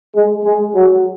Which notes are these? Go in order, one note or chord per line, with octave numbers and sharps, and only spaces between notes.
G#3
G#3
F#3